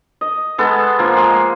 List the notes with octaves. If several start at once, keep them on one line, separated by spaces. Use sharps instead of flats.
D#5
G#3 B3 A4
F3 A#3
G#3